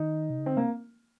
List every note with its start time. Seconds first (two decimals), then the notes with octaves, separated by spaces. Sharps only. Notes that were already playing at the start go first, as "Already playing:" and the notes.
Already playing: D#3 D#4
0.30 C3
0.39 C#3
0.46 D3 C4
0.56 C3 A#3